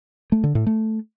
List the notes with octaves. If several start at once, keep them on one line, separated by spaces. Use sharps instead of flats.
A3
D3
A2
A3